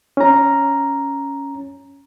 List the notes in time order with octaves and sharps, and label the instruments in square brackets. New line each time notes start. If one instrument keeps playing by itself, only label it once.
[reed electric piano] C#4 A#5